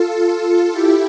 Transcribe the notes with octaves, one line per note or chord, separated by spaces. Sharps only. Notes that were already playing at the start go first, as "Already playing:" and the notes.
Already playing: F4 A4
E4 G4